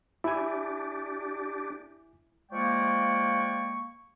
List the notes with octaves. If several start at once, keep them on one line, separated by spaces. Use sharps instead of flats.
D4 E4 G4 G#5
F3 G#3 A#3 D5 G5 C#6